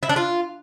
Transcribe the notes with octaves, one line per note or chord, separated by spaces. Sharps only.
E4
D4
F4